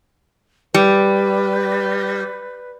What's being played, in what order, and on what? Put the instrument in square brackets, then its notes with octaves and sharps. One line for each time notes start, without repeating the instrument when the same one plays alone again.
[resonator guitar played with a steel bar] G3 [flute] B4